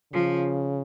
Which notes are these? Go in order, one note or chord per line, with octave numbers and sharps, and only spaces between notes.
C#3 F3